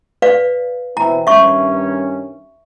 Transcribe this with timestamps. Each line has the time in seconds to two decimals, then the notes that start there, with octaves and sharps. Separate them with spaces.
0.22 B4 D5 F5
0.97 B2 E3 C4 A#5
1.27 G2 D#3 C#4 E5 C#6